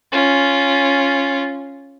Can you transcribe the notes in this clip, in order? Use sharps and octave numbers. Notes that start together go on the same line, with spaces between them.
C#4 F4